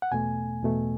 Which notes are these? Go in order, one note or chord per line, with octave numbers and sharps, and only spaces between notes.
F#5
E2 B2 A3 G#5
E2 B2 A3